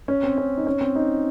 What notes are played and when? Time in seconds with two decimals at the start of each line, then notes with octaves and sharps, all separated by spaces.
0.08 C#4
0.23 C4
0.38 C#4
0.57 D#4
0.67 C#4
0.81 C4
0.95 D#4